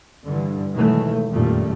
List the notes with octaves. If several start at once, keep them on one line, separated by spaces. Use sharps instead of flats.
G2 D3 E3
B2 D#3 E3 F#3 G#3 A3
F#1 F2 A#2 D#3 G3 A3